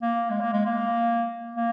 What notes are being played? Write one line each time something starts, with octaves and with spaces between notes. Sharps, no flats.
A#3
G#3
A#3
G#3
A#3
A#3